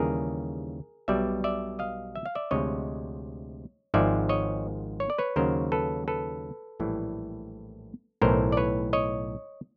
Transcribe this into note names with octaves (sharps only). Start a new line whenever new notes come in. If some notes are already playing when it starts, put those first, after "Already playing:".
Already playing: D#2 C#3 E3 G3 G#4 A#4
B1 B2 G3 D5 E5
D5 E5
D#5 F5
E5
F5
D5 E5
D2 C3 F3 G#3 C#5 D#5
G#1 G#2 F3 G#3 D5 E5
C#5 D#5
C#5
D5
B4 C#5
D#2 C#3 F#3 A#4 C5
A4 B4
A4 B4
A#1 A2 E3 G3
B1 A2 E3 A#4 C5
D5
B4 C#5
C#5 D#5